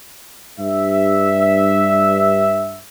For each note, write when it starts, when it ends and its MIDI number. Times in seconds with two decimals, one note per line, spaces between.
0.59 2.79 43
0.59 2.79 76